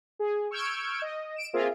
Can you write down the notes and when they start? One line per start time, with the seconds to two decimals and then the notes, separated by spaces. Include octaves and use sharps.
0.19 G#4
0.51 C#6 E6 F6 G6 G#6 D7
1.02 D#5
1.36 D7 E7
1.54 A#3 C4 F4 G#4 A#4 E5